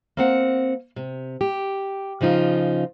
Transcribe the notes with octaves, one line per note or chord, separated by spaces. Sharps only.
A#3 C4 F#5
C3
G4
C#3 F3 D#4 F4